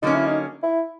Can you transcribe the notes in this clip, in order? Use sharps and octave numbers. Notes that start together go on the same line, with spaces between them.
D3 F#3 A#3 C#4 D#4
E4
D#4
E4